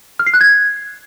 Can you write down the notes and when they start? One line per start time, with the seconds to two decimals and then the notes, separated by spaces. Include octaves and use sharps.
0.19 F6
0.26 C7
0.34 F#6
0.41 G#6